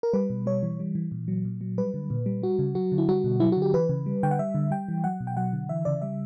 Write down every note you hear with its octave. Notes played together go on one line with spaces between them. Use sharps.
A#4
G3 B4
B2
G3 C#5
E3
G3
E3
A#2
F#3
A#2
F#3
G3 B4
D3
A#2
G3
G3 F#4
C#3
F#3 F#4
D3
E4
G3 F#4
B2
F#3 E4
D3 F#4
G4
E3 B4
C#3
G3
D3 G5
F#5
G3 E5
D3
G3 G5
E3
F#3 F#5
B2
G5
F#3 F#5
D3
E3 E5
C#3 D5
G3 E5